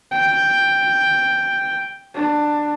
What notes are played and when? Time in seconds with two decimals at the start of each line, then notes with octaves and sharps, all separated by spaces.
0.12 G5
2.14 D4